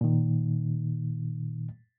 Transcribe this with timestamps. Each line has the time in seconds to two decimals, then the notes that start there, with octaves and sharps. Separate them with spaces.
0.01 A#2 D#3